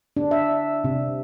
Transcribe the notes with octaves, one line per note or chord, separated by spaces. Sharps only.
D4
E5
C3